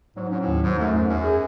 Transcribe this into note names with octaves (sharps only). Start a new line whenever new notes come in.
G#2 F#3
G#2 C#4
A2
D#2
G#2 F#3
F#2 A3
E2 G#2
F#2 C#4
G#4